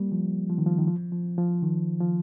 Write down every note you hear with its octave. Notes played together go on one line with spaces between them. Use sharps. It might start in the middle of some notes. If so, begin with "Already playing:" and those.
Already playing: G3 A#3
F3
F3
D#3
F3
D#3
F3
F3
F3
D#3
F3